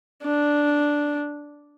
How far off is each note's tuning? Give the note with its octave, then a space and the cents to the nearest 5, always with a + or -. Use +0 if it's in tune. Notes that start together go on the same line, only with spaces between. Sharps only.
D4 -5